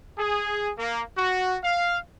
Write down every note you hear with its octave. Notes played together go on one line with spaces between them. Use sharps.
G#4
A#3
F#4
F5